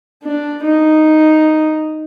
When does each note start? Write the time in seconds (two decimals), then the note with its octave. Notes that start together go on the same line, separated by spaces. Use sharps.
0.24 D4
0.63 D#4